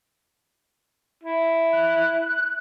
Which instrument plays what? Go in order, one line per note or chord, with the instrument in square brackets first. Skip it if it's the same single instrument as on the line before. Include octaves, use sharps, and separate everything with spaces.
[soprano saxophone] E4
[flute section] F#6